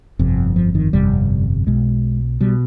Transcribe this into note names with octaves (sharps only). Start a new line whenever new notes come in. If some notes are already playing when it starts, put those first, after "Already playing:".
G1 F2 C3
F3
D#3
G1 F2 C3 G3
B1 B2 G#3
B2 G3